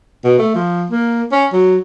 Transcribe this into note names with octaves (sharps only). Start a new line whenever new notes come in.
B2
A3
F3
A#3
C#4
F#3